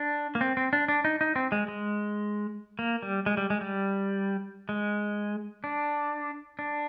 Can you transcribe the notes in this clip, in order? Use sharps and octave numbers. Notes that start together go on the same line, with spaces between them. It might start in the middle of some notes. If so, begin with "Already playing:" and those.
Already playing: D4
A#3
C4
C4
D4
D4
D#4
D#4
C4
G#3
G#3
A#3
G3
G#3
G3
G#3
G3
G#3
D4
D4